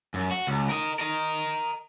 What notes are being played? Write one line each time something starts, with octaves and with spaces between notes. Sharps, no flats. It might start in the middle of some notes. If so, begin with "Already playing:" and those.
F#2
F#4
C#2
A#4 D#5
A#4 D#5